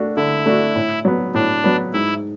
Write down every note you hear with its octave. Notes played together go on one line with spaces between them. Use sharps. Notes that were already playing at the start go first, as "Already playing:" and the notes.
Already playing: A3 D4 F#4
D3 E4
A3 D4 F#4
A2
F#3 B3
A2 D4
F#3 B3
G#2 E4